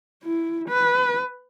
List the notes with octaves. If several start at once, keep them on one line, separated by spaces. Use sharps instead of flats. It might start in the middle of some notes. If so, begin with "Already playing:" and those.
E4
B4